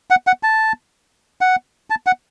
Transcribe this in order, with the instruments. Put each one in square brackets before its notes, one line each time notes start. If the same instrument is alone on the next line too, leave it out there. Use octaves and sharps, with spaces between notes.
[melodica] F#5
F#5
A5
F#5
A5
F#5